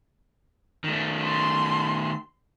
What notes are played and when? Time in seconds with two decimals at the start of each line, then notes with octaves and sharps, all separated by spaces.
0.84 D#3 A3
1.24 C6